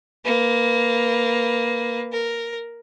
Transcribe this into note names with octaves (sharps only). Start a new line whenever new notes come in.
A#3 B4
A#4